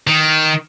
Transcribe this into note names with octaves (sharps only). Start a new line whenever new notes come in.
D#3